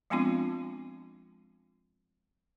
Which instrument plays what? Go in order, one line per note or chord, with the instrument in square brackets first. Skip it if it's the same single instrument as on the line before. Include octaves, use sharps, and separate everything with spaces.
[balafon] F3 G#3 B3 C4 D4 F4